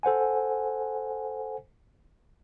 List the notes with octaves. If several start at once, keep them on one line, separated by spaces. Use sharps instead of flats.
A4 C5 F#5 G#5